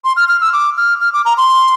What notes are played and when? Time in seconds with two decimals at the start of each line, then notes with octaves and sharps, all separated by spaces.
0.04 C6
0.16 F6
0.28 F6
0.41 E6
0.53 D6
0.77 F6
1.01 F6
1.13 D6
1.25 A#5
1.37 C6